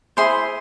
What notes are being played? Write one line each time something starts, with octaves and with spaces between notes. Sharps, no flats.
E4 G#4 C5 C6